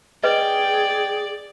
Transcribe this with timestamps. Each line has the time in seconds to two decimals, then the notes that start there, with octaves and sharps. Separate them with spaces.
0.23 G#4 B4 D5 D#5 G5